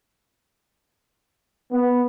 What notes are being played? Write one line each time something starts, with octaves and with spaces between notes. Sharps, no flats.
B3